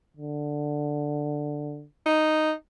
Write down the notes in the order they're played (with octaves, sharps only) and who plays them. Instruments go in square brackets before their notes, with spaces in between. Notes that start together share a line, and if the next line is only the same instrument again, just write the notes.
[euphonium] D3
[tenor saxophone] D#4